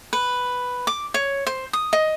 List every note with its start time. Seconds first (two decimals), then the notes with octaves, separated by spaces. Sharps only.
0.13 B4
0.87 D6
1.14 C#5
1.47 C5
1.73 D#6
1.93 D#5